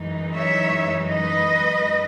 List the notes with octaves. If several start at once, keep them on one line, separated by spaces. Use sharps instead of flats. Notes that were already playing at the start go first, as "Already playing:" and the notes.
Already playing: F#2 E3 G#3 D#4
C#5 E5
B4 D#5